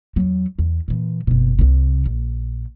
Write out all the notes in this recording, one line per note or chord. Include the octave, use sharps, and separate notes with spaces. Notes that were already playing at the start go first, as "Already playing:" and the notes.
E2 F#3
E2
A#2 E3
F#1 B2
C2 C3
A#1